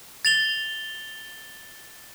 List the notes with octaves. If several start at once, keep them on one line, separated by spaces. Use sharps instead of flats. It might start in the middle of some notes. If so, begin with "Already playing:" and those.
A6 F7 G7